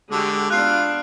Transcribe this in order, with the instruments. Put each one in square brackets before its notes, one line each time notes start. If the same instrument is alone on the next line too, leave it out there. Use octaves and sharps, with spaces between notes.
[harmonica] D3 [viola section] G#3 F#4 G4
[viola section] B3 D4 [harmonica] F4 [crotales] F#6 C7